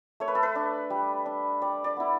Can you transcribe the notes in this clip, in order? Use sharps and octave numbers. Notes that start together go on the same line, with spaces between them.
A3 C#5
B4
A4
B4
D4
G3
D4
G3 D5
D5
B3 E4